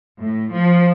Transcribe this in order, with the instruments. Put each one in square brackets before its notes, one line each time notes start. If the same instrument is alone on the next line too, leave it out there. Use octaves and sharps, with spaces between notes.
[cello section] A2
F3